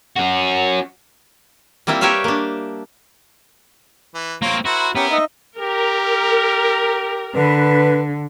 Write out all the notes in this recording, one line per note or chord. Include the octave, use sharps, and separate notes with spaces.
C#4 F#4
G3 A#3 C4 E4 F4
G4 A#4 B4 C#5 E5 F5
A#3 D4
E3
A#3 C4 F4 C#5
E4 F#4 A#4 C5
B3 C#4 E4 G4 A#4 G5
D#4 D#5 E5
G4 A#4
D3 B4